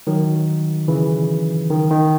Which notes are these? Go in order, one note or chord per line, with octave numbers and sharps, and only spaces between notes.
D#3 F#3
C#3 E3
D#3
D#3